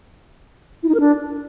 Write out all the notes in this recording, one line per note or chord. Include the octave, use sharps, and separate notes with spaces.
E4
D#4
A#4
D4